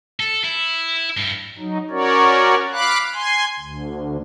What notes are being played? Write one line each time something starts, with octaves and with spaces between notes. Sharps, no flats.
A4
E4
G2
F#3 D#4
C#4 F#4 A#4 C#5 D5
F5 B5 D6 F#6
G#5 C6
D2